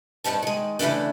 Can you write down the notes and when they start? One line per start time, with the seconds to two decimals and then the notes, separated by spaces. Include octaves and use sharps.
0.24 G2 D#3 C4 A5
0.43 D#3 G#3
0.79 C#3 E3 F#3 A3 D4